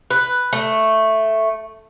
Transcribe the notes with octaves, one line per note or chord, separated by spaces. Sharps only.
B4
A3